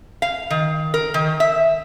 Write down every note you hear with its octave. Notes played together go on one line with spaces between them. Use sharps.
F5
D#3
A#4
D#3
E5